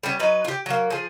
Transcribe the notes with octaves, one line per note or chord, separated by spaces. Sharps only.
G3 B3 C#4
F#3 D#4 B4
F4 G4
F#3 A#3
F3 G#4